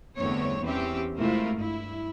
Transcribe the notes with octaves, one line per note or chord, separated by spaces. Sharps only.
E2 G2 D3 A3 C4 C#5
E2 E3 C4 C#4 G4 E5
C3 G#3 A3 E4 F4 A#4
G2 E4